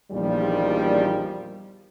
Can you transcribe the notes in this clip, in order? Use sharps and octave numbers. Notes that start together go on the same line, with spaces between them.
A#1 E2 A#2 D#3 F3 G3